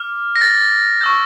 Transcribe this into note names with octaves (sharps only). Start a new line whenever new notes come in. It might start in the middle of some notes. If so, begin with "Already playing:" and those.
Already playing: D6 F6
A#6
A6
C#6 E6 G6